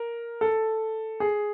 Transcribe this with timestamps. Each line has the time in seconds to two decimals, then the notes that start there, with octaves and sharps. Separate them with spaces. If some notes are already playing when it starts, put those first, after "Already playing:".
Already playing: A#4
0.41 A4
1.20 G#4